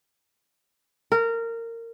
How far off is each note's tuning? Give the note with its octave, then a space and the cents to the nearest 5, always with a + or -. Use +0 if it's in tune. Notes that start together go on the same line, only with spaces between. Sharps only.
A#4 -20